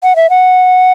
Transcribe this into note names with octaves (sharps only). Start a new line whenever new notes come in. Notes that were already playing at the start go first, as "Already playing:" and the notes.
F#5
E5
F#5